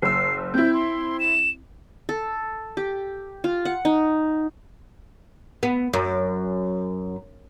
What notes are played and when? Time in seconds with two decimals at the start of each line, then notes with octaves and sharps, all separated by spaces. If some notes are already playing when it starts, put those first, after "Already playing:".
0.02 F#1 E6 C7
0.54 C4 E4 G6
0.74 C6
1.20 E7
2.09 A4
2.77 G4
3.44 F4
3.65 F#5
3.85 D#4
5.63 B3
5.93 F#2